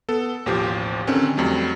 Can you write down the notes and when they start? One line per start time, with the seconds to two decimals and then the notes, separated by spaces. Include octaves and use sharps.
0.09 B3 A4
0.46 A1 D#2 B2 F3 G4 C5
1.07 D3 D#3 C4 C#4
1.37 F2 F#3 G3 A3